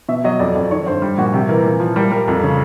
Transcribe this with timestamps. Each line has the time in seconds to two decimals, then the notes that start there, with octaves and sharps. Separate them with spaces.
0.09 B2 E5
0.24 F#3 D#5
0.39 F2 D5
0.56 F2
0.71 D#3 C#5
0.86 G2 C5
1.02 G3
1.18 A#2 F#4
1.33 C3 G4
1.49 E3 A#4
1.64 A#2
1.80 F3
1.96 G3 A#4
2.12 G3 A#4
2.28 F2
2.43 C#3